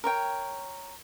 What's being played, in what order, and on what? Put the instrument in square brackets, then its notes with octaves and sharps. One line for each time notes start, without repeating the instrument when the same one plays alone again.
[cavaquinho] A#4 C#5 G5